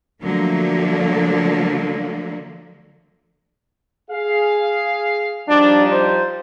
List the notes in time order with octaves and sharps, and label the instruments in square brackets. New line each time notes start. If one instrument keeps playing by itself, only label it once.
[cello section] D3 F3 F#3 A3 A#3
[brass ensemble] G#4 F5
[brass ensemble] F3 G3 D#4 [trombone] D4
[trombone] C5